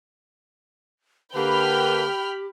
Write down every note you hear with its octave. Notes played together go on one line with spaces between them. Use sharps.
D3 A#3 G4 B4 G5 B5 F6